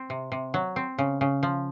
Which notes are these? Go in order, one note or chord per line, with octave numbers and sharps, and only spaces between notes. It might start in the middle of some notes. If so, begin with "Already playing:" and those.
Already playing: C4
C3
C3
F#3
C4
C#3
C#3
F3